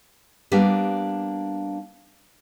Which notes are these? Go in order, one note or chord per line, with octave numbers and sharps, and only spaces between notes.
G3 A#3 B3 D4 G4